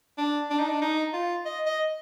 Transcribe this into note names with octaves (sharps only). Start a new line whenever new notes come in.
D4
D4
D#4
D4
D#4
F4
D#5
D#5